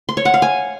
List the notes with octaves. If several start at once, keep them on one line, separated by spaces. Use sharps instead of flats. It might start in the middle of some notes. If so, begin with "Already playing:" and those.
C6
C#5
F#5
F5
G#5